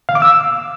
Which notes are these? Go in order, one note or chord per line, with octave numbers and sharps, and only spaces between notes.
F5
D6
E6